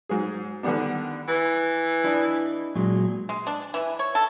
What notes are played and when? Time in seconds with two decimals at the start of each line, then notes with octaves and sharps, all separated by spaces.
0.09 G#2 F#3 G#4
0.63 D3 D#3 G3 B3 D4
1.28 E3
2.04 D4 E4 D#5
2.75 A#2 F#3 G#3
3.29 G#3
3.47 D4
3.74 E3
3.99 C#5
4.15 A4